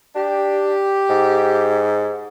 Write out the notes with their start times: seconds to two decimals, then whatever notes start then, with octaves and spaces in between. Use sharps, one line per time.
0.15 D4 G4
1.09 G#2